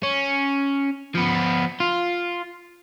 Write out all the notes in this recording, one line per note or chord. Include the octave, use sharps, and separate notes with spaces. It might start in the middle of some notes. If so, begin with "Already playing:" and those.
C#4
F3 B3
F4